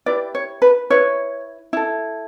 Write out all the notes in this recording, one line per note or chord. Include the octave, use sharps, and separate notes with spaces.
E4 G4 B4 D5
C#5
B4
E4 B4 C#5
E4 A4